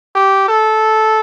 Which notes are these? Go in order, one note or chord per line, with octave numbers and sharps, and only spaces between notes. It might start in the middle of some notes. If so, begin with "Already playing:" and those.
G4
A4